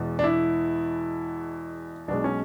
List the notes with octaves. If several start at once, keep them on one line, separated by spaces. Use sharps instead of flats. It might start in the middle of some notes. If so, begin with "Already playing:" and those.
Already playing: E2 B2 G#3
D4
E4
B1 B2 G#3 D4
C#4